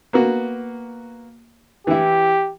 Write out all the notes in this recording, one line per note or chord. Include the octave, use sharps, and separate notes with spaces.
A#3 B3 F#4
E3 E4 G4